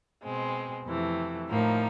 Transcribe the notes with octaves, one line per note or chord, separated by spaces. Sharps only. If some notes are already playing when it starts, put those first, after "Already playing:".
B2 G#3 C4
F2 C3 E3 A3
A2 F3 A#3 D#4